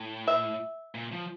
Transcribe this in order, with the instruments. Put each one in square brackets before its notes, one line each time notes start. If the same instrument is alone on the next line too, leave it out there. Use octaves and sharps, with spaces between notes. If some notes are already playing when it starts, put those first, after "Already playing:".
Already playing: [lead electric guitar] A2
[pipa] E5
[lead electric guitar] A#2
F3